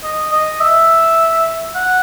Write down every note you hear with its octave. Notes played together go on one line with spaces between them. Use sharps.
D#5
D#5
E5
F#5